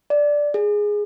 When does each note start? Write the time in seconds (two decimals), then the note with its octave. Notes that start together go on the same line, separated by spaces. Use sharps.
0.10 D5
0.54 G#4